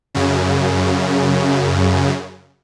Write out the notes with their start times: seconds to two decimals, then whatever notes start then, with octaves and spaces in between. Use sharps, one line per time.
0.15 F#2 C#3